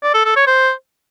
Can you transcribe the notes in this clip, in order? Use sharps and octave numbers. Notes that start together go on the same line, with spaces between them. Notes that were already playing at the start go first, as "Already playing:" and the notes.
D5
A4
A4
C#5
C5